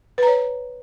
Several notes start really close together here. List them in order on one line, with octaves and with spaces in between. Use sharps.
B4 A#5 C#5